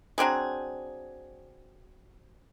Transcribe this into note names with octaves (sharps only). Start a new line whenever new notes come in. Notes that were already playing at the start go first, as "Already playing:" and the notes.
F#3 C4 D4 G#4